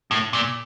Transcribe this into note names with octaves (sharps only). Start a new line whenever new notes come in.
A2
A#2